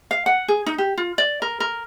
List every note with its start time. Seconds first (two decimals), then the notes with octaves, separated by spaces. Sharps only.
0.11 F5
0.26 F#5
0.48 G#4
0.66 D#4
0.78 G4
0.98 F4
1.18 D5
1.42 A#4
1.60 A#4